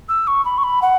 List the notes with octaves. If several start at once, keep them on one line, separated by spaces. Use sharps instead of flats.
E6
C#6
B5
C#6
B5
F#5